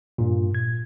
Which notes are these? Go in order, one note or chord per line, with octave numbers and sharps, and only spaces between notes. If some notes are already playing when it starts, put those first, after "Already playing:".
G2 A#2
G#6